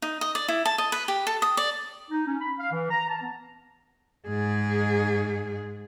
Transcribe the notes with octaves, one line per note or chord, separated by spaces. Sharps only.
D#4
D#5
D5
E4
A5
D#5
B4
G4
A4
D#6
D5
D#4
C#4
B5
F5
E3
A#5
A5
B3
G#2 G#4